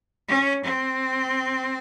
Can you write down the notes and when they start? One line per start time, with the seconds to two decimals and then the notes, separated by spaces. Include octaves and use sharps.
0.28 C#4
0.64 C4